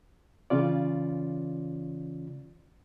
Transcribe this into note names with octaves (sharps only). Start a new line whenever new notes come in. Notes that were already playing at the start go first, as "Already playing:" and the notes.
C#3 E3 C#4 F4 D5